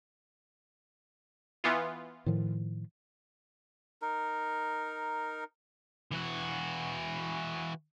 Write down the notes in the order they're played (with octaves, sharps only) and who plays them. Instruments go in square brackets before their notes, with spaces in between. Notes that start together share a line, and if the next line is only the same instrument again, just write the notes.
[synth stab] E3 B3 F4
[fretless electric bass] A2 D#3 F3
[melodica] D#4 A#4
[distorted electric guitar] E3 F#4